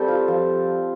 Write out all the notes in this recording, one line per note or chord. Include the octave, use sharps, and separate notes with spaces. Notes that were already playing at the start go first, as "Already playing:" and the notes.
Already playing: G3 C4 G4 A4
F4
F3